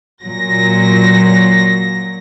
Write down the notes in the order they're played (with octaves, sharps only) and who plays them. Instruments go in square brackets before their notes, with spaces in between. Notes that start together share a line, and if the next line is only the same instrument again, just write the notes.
[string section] A#2 F#3 A#6